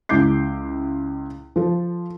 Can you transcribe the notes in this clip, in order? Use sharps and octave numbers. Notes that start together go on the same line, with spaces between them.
C#2 G#3 E4 D6 G6 C7
F3 A4